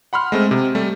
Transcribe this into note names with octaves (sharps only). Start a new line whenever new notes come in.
F#5 B5 C6 F6
G#3 A3 C4
C3
G3 A3